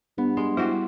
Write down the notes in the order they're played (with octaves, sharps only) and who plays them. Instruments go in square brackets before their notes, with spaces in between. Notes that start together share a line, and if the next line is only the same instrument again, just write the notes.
[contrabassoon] G2 [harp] B3
[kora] G#3 [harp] C6
[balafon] G3 E4 [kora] F#4 G4 C5